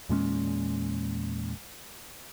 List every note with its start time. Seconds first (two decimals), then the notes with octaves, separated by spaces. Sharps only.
0.09 E2 A#2 G#3 C#4